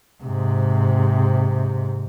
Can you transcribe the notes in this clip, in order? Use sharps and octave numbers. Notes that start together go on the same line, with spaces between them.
G#2 C3